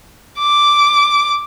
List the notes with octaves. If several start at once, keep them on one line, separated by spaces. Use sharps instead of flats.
D6